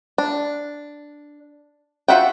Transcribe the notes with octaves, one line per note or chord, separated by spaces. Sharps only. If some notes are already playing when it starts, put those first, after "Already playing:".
D4
F4 F#4 E5 F#5 G5